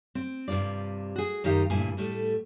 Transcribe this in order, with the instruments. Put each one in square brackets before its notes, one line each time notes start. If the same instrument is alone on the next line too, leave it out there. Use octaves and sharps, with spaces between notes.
[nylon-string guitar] C4
G2 C3 D#3 F4 D5
F#4 G#4
F#2 D#3 D#4 G4 F5
D2 G2 A#2 E4 G#5
A2 G3 A3